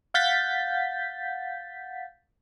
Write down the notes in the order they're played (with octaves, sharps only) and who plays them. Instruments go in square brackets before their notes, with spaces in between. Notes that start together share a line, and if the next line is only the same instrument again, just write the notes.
[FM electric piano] F5 F#5 G6 A6 B6